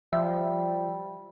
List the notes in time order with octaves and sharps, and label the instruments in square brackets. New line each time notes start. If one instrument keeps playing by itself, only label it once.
[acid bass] F3 [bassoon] G3 [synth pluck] E5